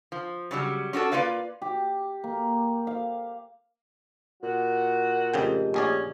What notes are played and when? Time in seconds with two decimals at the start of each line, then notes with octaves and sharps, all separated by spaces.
0.12 F3
0.51 C#3 F#3 G3
0.93 C#4 D4 F#4 A4
1.12 A#3 F4 B4 D5 F5
1.62 G4
2.24 A#3
2.87 F5
4.43 A#2 F#4
5.34 F2 C#3 A3 G4 D#5 G5
5.74 A#1 C#4 G#4 D5